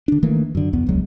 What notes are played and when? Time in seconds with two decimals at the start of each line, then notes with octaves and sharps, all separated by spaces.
0.08 D3 D4
0.23 D#3 E3 A3 A#3
0.55 F#2 D3
0.73 B1 E2 B3
0.87 E1 C#2 F#3 G#3